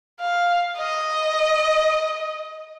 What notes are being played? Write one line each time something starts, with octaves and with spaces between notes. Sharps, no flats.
F5
D#5